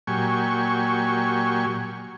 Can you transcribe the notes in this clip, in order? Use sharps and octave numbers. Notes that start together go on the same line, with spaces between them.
A#2 F#3 G4 G#5 C#6